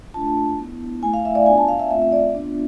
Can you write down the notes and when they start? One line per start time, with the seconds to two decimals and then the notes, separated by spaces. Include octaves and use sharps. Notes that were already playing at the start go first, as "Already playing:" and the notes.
0.14 A3 D4 F4 A5
0.58 B3 E4
1.02 A3 E4 G#5
1.13 F5
1.25 E5
1.35 D5
1.46 B3 D4 F4 G#5
1.58 A5
1.68 F5
1.79 E5
1.91 A3 C4 F4 E5
2.02 E5
2.12 D5
2.34 B3 D4 F4